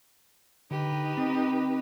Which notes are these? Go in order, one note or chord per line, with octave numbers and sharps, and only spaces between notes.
D3 D#4 G4 B4
C4